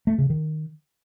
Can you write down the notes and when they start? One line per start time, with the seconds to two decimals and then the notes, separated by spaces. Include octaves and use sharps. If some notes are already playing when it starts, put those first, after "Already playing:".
0.07 A3
0.18 C#3
0.30 D#3